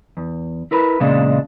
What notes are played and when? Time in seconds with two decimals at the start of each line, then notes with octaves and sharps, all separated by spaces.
0.17 E2
0.71 E4 A#4 B4
1.00 E2 A#2 C#3 G#3 D4